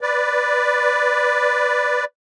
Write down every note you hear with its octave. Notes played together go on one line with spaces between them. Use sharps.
B4 D5